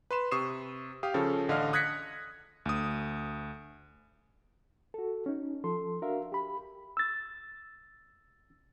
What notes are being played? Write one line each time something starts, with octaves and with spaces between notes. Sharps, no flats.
B4 C6 E7
C3 C#6 D#6 C7 E7
G4 F5 D#6
C#3 F3 C#4 A4
A1 D3 D#5 F5 F6
D#6 F#6 G#6 A#6 B6 C#7
D2 D#6
F#4 A4
C#4 D#4
F3 A4 C6
D4 F#4 A#4 E5 F5
G4 B5
E6 A6